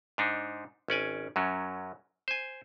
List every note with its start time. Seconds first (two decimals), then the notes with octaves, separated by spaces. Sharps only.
0.18 G#2 D4 D#4
0.88 G#1 C#4 D5 G#5
1.36 F#2 F#3 C#4
2.28 C5 G#5